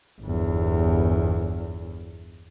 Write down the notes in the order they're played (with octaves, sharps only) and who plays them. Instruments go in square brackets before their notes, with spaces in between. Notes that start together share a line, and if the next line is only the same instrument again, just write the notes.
[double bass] G1 E2